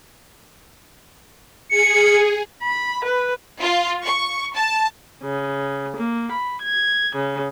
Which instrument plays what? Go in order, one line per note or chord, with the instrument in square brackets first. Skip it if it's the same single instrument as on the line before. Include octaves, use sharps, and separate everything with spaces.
[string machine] G#4 [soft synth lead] C#7
[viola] B5
B4
[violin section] F4
C#6
A5
[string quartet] C#3
A#3
B5
G#6
C#3